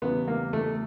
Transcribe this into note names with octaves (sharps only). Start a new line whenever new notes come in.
E2 C#3 E3 G3 B3
A#3
A3